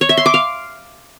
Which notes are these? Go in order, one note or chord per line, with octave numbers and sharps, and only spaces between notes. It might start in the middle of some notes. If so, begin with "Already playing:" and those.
C#5
E5
C6
D6
F5